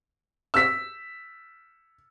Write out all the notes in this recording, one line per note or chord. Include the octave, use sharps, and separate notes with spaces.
E6 B6